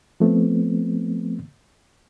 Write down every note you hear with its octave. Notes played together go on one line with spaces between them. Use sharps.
F3 A3 B3 C4